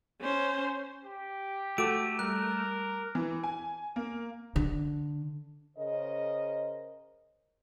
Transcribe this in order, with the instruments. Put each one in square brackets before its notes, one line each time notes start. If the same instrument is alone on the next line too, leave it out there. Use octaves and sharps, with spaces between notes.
[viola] C#4 C5
[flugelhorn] G4
[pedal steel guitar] A3 [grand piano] F#4 A4 [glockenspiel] D6 D7
[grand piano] G3 [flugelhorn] A#4 [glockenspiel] F#6
[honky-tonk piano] E3
G#5
A#3
[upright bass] D3
[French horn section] C#3 A#4 C5 D#5